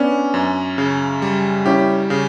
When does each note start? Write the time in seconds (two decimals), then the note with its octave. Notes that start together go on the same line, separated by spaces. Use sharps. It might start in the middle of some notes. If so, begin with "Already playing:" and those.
Already playing: B3 C#4 D4
0.34 F#2
0.78 C#3
1.22 G3
1.66 C#4 E4 G4
2.10 C#3